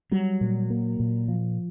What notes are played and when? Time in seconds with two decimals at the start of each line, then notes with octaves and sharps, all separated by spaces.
0.11 F#3 G3
0.41 A#2
0.70 A#3
1.00 A#2
1.28 F3